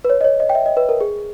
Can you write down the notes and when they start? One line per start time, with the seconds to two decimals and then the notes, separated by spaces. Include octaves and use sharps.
0.04 B4
0.10 C#5
0.21 D#5
0.24 C#5
0.40 D#5
0.49 G5
0.55 E5
0.66 D#5
0.77 B4
0.89 A#4
1.01 G#4